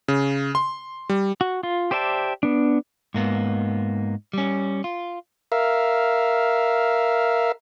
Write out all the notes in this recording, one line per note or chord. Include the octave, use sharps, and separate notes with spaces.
C#3
C6
G3
F#4
F4
G4 C5 D5 E5 A5
B3 D4
G#2 A#3 B3
G3 C#4
F4
A#4 E5 F5